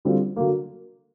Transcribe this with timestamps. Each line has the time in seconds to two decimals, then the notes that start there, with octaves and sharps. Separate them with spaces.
0.05 D3 G3 C4 F4
0.36 D3 F#3 A#3